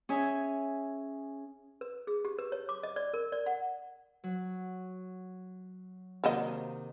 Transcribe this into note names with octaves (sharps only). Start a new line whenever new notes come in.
C#4 G#4 E5 G#5
B4
G#4
G4
B4
C#5
D6
D#5
D5
A#4
D5
F#5
F#3
C3 D#3 F#3 A#3 D#5